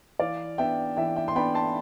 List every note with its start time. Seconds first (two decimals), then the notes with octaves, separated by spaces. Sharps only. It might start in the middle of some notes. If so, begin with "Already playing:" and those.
0.19 E3 D5 F5
0.58 B3 D4 E5 G5
0.97 E3 E5 G5
1.16 E5 G5
1.28 C6
1.35 B3 D4 G5 B5
1.54 A5 C6